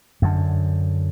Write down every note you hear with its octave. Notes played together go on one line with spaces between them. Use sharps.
F#2 D3